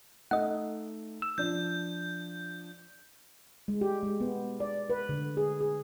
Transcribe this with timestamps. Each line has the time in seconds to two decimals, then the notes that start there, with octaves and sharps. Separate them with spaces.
0.31 A3 D#4 D#5 F#5
1.22 E6
1.38 F3 D4 G6
3.68 G#3
3.81 G4
4.03 G#3
4.21 B3
4.60 D5
4.90 B4
5.09 D3
5.37 G#4
5.61 G#4